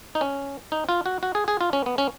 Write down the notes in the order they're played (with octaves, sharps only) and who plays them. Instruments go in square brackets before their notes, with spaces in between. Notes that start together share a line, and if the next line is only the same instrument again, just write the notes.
[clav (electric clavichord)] D#4
C#4
D#4
F4
F#4
F#4
G#4
G#4
F4
C#4
B3
C#4